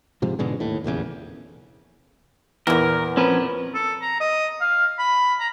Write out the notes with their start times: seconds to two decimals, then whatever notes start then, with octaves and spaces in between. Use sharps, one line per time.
0.22 G#2 C3 F3 G#3
0.39 G#2 B2 D3 G#3
0.60 D#2 A2
0.84 F1 A#1 E2 C#3
2.67 E2 A#2 E3 A#4
3.17 F3 C4 C#4 A#4 B4
3.74 A4
4.01 A#5
4.20 D#5
4.61 F5
4.99 B5
5.40 A#5